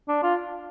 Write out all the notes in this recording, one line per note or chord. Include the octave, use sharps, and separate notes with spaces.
D4
F4